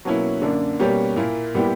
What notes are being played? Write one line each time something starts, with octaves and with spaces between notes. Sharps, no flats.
B2 F#3 A#3 C#4 E4
F#2 D3 A#3 D4
B2 G3 A#3 C#4 G4
A#2 A#3 E4
A#2 G3 B3 E4 G4